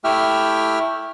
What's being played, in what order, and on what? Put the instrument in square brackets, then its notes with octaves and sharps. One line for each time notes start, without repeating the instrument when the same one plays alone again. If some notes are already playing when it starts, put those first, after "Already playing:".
[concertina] A3 E4 G4 E5 G5 F6